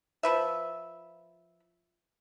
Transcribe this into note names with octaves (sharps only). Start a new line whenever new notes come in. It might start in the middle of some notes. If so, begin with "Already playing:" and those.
F3 B4 E5